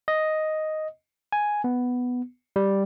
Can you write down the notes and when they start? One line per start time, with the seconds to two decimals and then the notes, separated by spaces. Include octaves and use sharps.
0.08 D#5
1.32 G#5
1.64 B3
2.56 G3